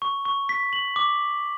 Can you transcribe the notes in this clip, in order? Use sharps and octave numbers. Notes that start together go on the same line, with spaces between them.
C#6
C#6
B6
F#7
D6